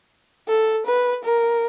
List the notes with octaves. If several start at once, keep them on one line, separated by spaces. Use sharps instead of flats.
A4
B4
A#4